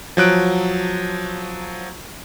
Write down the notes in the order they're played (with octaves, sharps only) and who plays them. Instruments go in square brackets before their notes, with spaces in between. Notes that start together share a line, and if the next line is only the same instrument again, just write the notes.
[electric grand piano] F3 F#3 F#6 D7